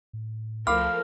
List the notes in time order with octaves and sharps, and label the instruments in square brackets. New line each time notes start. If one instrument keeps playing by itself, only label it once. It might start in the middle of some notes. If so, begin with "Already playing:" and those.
[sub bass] A2
[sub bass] C#2 [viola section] F3 A3 A#4 [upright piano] F5 B5 D6 [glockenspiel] F6